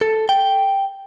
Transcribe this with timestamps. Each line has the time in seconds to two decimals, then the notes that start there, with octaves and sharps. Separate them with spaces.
0.01 A4
0.29 G5